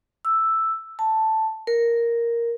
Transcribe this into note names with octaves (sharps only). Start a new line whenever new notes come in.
E6
A5
A#4